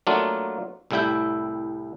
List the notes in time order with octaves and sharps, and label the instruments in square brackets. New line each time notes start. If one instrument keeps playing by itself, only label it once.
[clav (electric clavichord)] F#3 A3 A#3 D4 F4
C2 A2 G3 E4 E5 G5